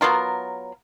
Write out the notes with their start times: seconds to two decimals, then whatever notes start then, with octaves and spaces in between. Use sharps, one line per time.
0.01 F#3 B3 F4 A#4